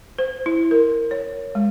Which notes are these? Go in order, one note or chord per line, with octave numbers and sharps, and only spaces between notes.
C5
E4
A#4
C#5
G#3